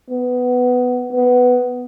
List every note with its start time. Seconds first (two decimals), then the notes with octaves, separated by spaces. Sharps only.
0.10 B3
1.13 B3